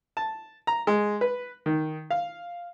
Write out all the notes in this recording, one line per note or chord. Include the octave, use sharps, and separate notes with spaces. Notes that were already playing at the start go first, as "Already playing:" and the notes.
A5
A#5
G#3
B4
D#3
F5